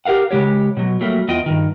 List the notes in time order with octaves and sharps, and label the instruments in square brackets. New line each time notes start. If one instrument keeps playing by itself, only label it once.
[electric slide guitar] G4 A#4 F5 F#5
C#3 G#3 G4 C#5
B2 F#3
F#3 G3 A3 A#3
E2 B3 F4 D#5 G5
G2 D#3